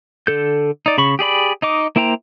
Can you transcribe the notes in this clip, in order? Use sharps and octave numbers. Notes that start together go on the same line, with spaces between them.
D3 A4 G6
D#4 D5
C#3 B5 C#6
G4 G#4 D5 B5
D#4 D#5 D6
A#3 E4 C5 G5 A#5